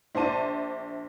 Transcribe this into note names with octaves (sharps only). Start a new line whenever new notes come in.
A#1 C5 D5 A5 D#7